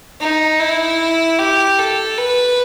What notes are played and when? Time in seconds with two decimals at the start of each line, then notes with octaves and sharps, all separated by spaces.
0.21 D#4
0.60 E4
1.39 G4
1.79 A4
2.18 B4